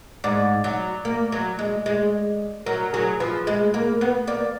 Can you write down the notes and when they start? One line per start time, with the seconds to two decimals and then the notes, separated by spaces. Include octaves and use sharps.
0.24 G#2 D5
0.64 F#3
1.05 A#3
1.32 F#3
1.59 G#3
1.86 G#3
2.66 F#3 A#4
2.93 F#3 G#4
3.20 F3 B4
3.47 G#3
3.74 A#3
4.01 B3
4.27 A#3 D5